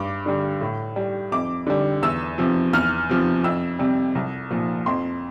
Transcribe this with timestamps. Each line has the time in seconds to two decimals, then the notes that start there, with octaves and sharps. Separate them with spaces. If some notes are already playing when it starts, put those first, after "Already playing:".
Already playing: G2 D6
0.26 D3 G3
0.61 A2
0.96 G3
1.32 F2 D6
1.67 D3 G3
2.02 E2 E6
2.38 C3 F3
2.73 E2 F6
3.09 C3 F3
3.44 F2 E6
3.79 C3 G3
4.15 C2
4.51 A#2 F3
4.86 F2 C6